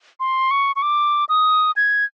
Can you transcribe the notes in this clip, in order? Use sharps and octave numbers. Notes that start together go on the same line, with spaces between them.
C6
C#6
C#6
D6
D#6
G#6